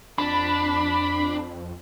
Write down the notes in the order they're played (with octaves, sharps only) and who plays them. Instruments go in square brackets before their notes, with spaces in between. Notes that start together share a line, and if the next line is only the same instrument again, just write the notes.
[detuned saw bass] F2 [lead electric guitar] D4 [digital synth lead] B5